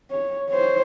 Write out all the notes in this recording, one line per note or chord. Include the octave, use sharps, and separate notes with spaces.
C#5
C5 C#5